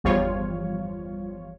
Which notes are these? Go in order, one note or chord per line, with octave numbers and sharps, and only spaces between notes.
G1 E2 F3 G3 F4 C#5